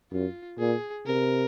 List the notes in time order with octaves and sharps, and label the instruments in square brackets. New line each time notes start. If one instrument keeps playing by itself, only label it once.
[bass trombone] F#2 [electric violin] F4
[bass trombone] A#2 [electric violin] G#4
[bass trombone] C3 [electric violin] A#4